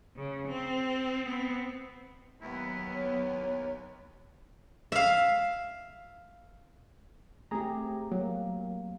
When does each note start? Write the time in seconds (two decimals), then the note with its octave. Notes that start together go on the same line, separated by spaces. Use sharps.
0.16 C#3
0.47 C4
1.26 B3 C4
2.41 D#2 F#3 B3 E4
2.94 C#5
4.92 E5 F5
7.51 A3 C4 G4 G#4 A#5
8.12 F#3 A#3